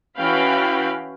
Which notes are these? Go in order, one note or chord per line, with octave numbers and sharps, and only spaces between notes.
E3 C#4 F#4 F5 G5 B5